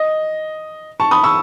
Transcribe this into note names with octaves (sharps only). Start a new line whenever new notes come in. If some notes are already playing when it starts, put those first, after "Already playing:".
Already playing: D#5
A5 C#6
B5 D#6
C#6 E6